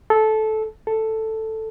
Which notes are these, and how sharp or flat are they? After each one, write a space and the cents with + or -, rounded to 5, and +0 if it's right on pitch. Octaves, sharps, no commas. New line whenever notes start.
A4 -15
A4 +5